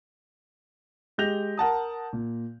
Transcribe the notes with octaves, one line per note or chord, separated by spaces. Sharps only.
G#3 G4 G6 A#6 F7
A#4 F#5 A5 D#6
A#2